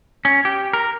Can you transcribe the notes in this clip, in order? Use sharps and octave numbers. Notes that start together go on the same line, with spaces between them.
C#4
G4
A#4